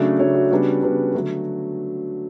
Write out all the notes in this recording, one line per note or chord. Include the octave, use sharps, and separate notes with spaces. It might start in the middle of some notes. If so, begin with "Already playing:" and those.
Already playing: C#3 F#3 A3 D4
C#3 F#3 A3 D4 C#5
F#4
C#3 G3 B3 D4 F#4
C#3 G3 B3 D4
D3 F#3 A3 F#4